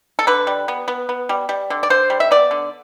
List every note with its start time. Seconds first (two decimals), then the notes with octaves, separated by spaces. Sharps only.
0.19 A4
0.27 D3 B4
0.47 G3
0.68 B3
0.88 B3
1.09 B3
1.29 G3
1.49 G3
1.70 D3
1.83 D5
1.90 D3 C5
2.10 G3
2.20 E5
2.31 B3 D5
2.51 D3